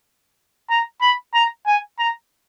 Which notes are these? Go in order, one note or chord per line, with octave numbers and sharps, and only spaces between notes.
A#5
B5
A#5
G#5
A#5